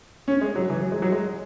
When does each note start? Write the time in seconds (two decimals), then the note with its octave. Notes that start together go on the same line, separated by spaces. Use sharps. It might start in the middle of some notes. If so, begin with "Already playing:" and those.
0.28 C#4
0.41 G#3
0.56 F#3
0.70 E3
0.80 F#3
0.92 G#3
1.02 F#3
1.12 G#3